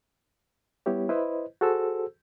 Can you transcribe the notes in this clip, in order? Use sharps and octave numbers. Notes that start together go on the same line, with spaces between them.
G3 B3 E4 G4 C#5
E4 B4 C5 D#5
F#4 G#4 A4 C5 E6